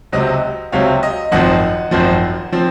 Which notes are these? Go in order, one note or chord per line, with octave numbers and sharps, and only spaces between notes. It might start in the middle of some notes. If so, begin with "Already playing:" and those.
C#2 C3 F#3 C4 D#5
C#2 C3 F#3 C4 C#5 F5
D#5
G#1 F#2 F3 C4 D#5 F#5
G#1 F#2 F3 C4
F3 C4